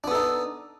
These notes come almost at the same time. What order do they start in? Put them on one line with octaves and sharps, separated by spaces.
D4 B3 A4 D#4